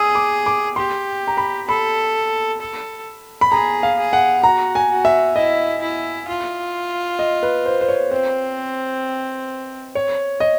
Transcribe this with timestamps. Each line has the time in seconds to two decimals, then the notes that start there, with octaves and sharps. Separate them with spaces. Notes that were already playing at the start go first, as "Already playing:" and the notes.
Already playing: G#4 D#6 E6
0.15 D6
0.46 D6
0.76 G4 C6
1.27 A#5
1.37 B5
1.68 A4 B5
2.61 A4
3.41 B5
3.52 G#4 A#5
3.83 F5
3.98 G#4
4.13 F#5
4.43 F#4 A#5
4.75 G#5
4.91 F#4
5.05 E5
5.36 E4 D#5
5.82 E4
6.28 F4
7.19 D#5
7.43 B4
7.66 C5
7.81 C5
7.88 C#5
8.11 C4 C5
9.95 C#5
10.40 D#5